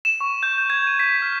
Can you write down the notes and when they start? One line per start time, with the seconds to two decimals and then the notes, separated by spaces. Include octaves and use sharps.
0.05 E7
0.21 C#6
0.43 G6
0.70 G#6
0.87 D#7
1.00 B6
1.22 F6